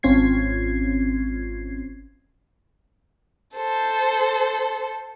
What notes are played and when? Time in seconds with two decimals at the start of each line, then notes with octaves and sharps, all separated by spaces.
0.03 G#1 C4 C#4 F4 G#6 C7
3.56 A4 C5